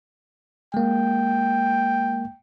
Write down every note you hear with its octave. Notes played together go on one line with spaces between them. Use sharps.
G#3 A#3 G5